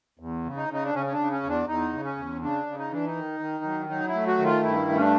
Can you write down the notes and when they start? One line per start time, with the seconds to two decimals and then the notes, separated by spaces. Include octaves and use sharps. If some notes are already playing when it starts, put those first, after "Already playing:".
0.19 E2
0.44 C#3
0.57 D#4
0.69 C#3 D#4
0.84 D4
0.95 C#3 C#4
1.06 C#4
1.12 D4
1.19 C#3
1.32 C#4
1.43 E2
1.49 D4
1.68 E2 D#4
1.93 C#3
2.04 C#4
2.17 E2
2.42 C#3 D4
2.66 C#3
2.79 D#4
2.92 E3 D4
3.06 D#4
3.15 D#3
3.40 D#3
3.64 F#3
3.89 F#3 D#4
4.08 E4
4.15 A3
4.27 F#4
4.38 D#3
4.45 F4
4.63 G2 E4
4.89 A3
4.95 C#4
5.00 D4